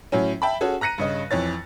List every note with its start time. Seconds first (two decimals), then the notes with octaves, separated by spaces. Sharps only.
0.12 A2 F#3 C#4
0.42 E5 G5 A5 B5
0.61 C#4 F#4 G#4 A4
0.81 A#5 F#6 A#6 C#7 D#7
0.98 G2 C#3 D#5
1.31 F2 E3 C#5 A6